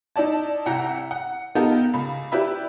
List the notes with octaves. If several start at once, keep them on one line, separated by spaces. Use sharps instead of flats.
D#4 E4 D5 A5
C2 E4 F#5 G5 A#5
F#5
B3 D#4 F4 G4 A4 A#4
C#2 B5
E4 G4 B4 D5 E5 B5